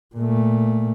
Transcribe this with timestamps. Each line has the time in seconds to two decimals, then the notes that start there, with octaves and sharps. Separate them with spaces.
0.16 A#2 A3